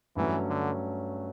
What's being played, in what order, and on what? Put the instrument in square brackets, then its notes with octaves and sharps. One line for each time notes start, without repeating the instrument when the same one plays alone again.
[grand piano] G2 F#3 A3 C#4 [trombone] E3
[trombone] D3